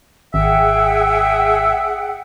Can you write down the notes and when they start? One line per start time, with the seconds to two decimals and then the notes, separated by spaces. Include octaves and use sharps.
0.34 G#1 G#4 E5 F#5 G5